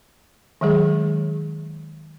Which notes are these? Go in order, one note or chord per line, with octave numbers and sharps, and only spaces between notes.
D#3 F#3 G#3 G#4